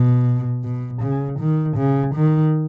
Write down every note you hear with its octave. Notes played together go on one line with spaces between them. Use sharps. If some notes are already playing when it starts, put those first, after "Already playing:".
Already playing: B2
B2
C#3
D#3
C#3
D#3